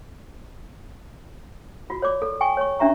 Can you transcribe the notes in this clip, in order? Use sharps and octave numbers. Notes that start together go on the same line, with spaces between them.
F4 F#4
C#5 D5 D6
A4
G5 G#5 C#6
C#5 C#6
C#4 D4 G4 E5 A#5 C#6